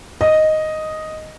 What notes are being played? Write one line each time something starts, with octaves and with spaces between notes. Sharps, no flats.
D#5